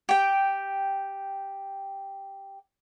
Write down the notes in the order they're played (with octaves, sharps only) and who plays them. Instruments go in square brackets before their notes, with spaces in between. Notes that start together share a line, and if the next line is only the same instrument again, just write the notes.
[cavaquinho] G4 G5